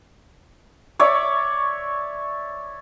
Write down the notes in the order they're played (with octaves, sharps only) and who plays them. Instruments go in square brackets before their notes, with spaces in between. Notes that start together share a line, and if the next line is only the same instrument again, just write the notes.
[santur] C#5 D5 E5 C#6